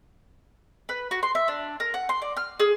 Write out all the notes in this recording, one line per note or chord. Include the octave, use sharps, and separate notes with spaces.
B4
F#4
C6
E5
D4
A#4
F#5
C6
D5
F6
G#4